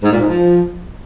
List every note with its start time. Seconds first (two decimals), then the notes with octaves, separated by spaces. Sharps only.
0.03 G#2
0.11 A#2
0.20 G#2
0.28 F3